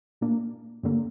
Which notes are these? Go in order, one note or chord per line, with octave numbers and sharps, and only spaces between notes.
A#2 A#3 D4
G2 D3 A#3